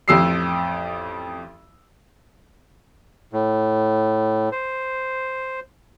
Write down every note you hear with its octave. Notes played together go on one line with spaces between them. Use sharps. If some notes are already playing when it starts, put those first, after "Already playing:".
A1 F2 E6 C7
A2
C5